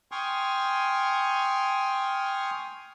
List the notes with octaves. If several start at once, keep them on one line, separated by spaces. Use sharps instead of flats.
G5 G#5 C6 C#6 D#6 F6